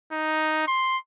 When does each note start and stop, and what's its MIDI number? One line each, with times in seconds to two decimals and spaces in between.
0.12 0.64 63
0.68 0.98 84